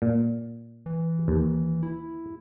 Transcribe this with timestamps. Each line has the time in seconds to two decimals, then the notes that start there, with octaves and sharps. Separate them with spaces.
0.02 A#2
0.86 E3
1.28 D#2
1.83 E4